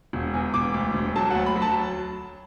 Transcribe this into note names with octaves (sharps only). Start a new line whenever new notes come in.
E1
E2
E1 D6
D2
E1
F#3 A5
D2 F#5
B5
F#3
A5